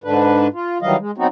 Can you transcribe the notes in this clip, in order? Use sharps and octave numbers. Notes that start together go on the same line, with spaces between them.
G#2 D3 D4 B4
F4
D#3 E3 F#3 G3 D#5 F5
G#3
F#3 B3 C4 D#4 F#4